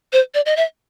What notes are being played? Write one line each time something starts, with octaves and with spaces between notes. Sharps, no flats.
C5
D5
D#5
E5